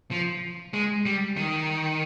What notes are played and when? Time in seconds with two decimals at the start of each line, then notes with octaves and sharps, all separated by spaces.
0.11 F3
0.74 G#3
1.06 G3
1.37 D#3